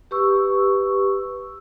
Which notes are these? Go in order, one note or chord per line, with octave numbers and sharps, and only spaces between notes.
G4 B4 C#6 E6